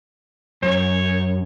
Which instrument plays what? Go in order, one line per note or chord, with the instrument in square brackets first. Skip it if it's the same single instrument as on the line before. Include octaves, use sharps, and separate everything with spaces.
[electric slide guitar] F#2 [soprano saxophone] C#5